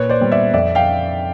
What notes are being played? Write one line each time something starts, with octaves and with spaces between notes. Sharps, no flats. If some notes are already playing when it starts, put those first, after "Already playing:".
Already playing: A#2 B4 C#5
C5 D5
G3 B3
D5 E5
F2 D5 E5
F5 G5